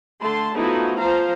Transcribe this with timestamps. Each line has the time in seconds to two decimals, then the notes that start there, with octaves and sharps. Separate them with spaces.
0.21 D3 A3 A5 C6
0.54 F3 A3 B3 D#4 E4 F#4
0.99 F3 C5 F5 A#5